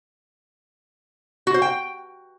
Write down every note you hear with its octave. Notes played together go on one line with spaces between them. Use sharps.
F#4
C5
G5